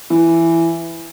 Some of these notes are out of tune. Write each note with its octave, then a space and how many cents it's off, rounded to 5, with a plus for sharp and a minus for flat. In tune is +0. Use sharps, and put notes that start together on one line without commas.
E3 +10